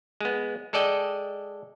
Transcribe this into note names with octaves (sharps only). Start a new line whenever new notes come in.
G#3 B3
G#3 A4 D5 D#5 G5